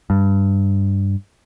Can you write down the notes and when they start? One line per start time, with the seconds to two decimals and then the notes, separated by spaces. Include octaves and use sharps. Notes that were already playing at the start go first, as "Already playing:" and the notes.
0.10 G2